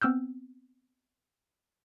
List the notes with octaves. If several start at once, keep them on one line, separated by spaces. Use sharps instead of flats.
B3 C4 E6 F6 G6